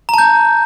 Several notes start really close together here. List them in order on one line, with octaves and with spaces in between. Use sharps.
A#5 A5 G6